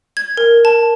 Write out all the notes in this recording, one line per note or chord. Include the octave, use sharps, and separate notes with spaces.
G#6
A#4
A5